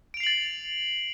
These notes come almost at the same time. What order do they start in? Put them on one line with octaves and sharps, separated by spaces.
D7 F7 C7 F#7 A6